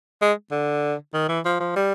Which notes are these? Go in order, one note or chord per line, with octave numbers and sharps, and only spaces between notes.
G#3
D3
D#3
E3
F3
F3
G3